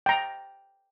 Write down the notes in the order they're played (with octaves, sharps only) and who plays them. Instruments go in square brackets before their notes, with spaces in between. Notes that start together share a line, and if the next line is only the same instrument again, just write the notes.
[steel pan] G5 A#5